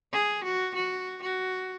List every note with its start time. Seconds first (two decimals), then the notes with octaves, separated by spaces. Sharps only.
0.12 G#4
0.44 F#4
0.75 F#4
1.22 F#4